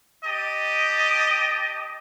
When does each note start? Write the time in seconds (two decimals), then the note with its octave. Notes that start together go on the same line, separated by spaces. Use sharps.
0.25 G4 D#5 A5